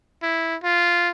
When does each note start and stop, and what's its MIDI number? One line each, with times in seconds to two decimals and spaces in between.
0.23 0.56 64
0.63 1.11 65